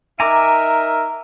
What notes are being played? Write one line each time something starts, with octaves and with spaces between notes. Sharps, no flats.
D#4 A#4 E5 G#5 A#5 D6